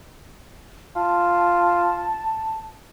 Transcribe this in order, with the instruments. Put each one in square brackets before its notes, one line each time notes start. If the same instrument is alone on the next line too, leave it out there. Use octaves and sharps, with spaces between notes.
[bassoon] F4 [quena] A5